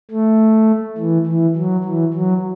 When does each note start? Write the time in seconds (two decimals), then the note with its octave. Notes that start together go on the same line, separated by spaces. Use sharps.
0.11 A3
0.98 E3
1.26 E3
1.56 F#3
1.84 E3
2.14 F#3